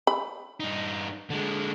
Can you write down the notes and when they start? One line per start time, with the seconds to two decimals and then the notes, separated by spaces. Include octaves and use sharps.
0.07 B5
0.60 G2 D#4
1.30 D3 G#3